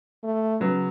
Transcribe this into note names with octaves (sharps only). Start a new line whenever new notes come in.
A3
C#3 F#3 B3